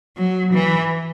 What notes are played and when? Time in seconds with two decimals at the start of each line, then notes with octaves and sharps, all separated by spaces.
0.17 F#3
0.53 E3